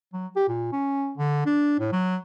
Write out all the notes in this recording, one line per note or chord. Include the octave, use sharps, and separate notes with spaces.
F#3
G4
A#2
C#4
D3
D4
A2
F#3